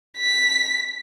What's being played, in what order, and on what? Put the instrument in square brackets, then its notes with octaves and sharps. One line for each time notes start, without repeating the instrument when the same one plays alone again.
[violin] B6